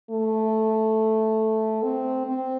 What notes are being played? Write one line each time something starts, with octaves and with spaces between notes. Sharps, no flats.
A3
C4
C4